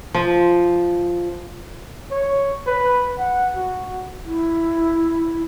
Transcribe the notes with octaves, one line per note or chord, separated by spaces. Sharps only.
F3
C#5
B4
F#5
F#4
E4